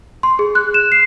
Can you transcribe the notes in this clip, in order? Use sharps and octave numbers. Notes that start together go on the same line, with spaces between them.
C6
G#4
F#6
E7
C7